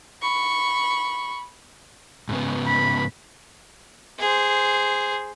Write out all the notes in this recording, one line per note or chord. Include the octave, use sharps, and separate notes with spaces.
B5 C#6
G#2 C#3 B3
B5
G#4 C5